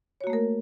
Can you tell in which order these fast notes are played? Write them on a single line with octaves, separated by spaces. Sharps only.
C#5 F#4 A#3 A3 A#4